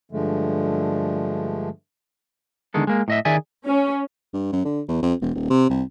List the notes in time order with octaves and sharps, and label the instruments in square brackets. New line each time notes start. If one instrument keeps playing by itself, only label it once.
[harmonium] G2 D3 F3 G#3 A3
[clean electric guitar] E2 D3 D#3 G#3 A4
G#3 A#3
A2 D#5 E5
D#3 G#4 D5 E5 G#5
[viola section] C#4
[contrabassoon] G2
F#2
D3
E2
F2
E1
D#1
C3
C2